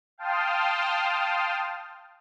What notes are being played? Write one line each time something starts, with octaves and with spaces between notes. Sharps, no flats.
F5 G5 A5 C6 D#6 F6